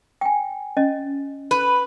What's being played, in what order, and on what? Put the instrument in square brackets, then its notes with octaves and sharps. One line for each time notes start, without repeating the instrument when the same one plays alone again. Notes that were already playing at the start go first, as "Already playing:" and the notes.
[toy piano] G5 G#5
C#4 D#5
[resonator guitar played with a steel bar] B4